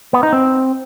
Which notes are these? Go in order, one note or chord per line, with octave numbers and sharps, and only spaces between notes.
B3
D#4
C4